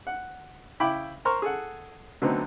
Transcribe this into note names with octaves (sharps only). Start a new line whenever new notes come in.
F#5
C#3 E4 G5 B5 D6
A#4 C5 A#5 C6 C#6 F6
G#4 A4 F#5
D3 F#3 A3 B3 C4 D#4